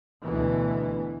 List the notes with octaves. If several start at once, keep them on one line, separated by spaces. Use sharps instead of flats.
D2 B2 E3